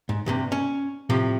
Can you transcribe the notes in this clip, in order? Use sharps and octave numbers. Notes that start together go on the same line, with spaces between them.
G#2
D2 G2 C3
C#4
A2 C3 F3